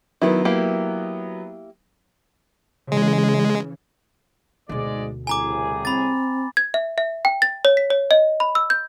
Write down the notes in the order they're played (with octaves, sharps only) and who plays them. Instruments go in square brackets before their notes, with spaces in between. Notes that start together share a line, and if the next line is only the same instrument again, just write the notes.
[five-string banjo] D#3 E4 [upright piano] F#3 B3
[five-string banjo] A#3 E4 G4
[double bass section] C#3 E3 [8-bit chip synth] G#3
[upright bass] D2 B2 [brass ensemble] G#2 G#3 D5
[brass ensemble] C2 A2 G#4 [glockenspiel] G#5 A#5 D6
[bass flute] C4 [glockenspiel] B5 A6
[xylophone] G#6
E5
E5
G5
A6
C#5
B6
C#5
D#5
B5
E6
G6